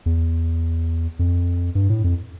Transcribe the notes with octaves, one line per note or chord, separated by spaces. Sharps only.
E2
F2
G2
A2
F2